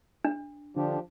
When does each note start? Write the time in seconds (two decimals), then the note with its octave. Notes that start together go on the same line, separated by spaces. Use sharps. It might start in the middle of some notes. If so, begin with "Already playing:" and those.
0.24 D4
0.76 D3 F3 D4 G4